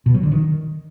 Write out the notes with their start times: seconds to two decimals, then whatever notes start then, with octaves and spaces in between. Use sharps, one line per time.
0.06 B2
0.14 F#3
0.23 D3
0.32 D#3